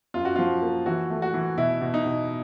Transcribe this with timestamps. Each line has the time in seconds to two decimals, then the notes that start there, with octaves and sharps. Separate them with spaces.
0.14 F#2 F4
0.25 F#4
0.36 F3 F4
0.62 A#3
0.86 E3 F#4
1.10 A3
1.22 F#4
1.34 E3
1.57 B2 E4
1.81 B2
1.94 D#4
2.06 B2